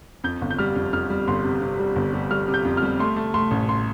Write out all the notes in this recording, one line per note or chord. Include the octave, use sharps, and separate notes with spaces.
F2 G6
G1
G6
G3 F6
F2
F2 F6
G3
G1 C6
C3
C3
G3
G1
G3
G3 F6
C3
G6
F2
F6
G3
A3 C6
A3
A3 C6
A1
C6